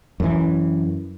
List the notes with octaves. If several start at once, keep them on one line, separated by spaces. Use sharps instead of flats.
F#2 E3